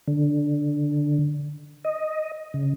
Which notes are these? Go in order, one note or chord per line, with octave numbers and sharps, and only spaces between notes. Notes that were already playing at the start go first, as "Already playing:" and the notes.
D3
D#5
C#3